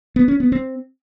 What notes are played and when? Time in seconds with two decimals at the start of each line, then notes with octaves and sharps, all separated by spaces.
0.16 B3
0.28 C#4
0.40 B3
0.52 C4